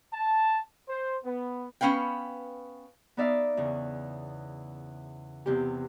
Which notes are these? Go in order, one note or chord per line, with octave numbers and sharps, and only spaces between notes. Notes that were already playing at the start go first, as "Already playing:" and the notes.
A5
C5
B3
B3 C#4 B4 F5 G5
B3 D#4 D5 E5 F5
E2 C#3
E2 C3 G4